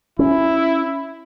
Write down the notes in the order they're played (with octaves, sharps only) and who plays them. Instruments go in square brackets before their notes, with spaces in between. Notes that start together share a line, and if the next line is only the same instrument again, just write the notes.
[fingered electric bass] C#4 [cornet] E4